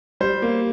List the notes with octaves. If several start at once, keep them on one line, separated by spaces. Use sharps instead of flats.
G3 C5
A#3